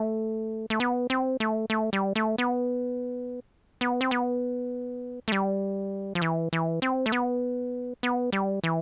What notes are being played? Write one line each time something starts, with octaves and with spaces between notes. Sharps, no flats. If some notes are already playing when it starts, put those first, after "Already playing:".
Already playing: A3
A3
B3
C4
A3
A3
G3
A3
B3
B3
C4
B3
A3
G3
F3
E3
E3
C4
A3
B3
B3
G3
E3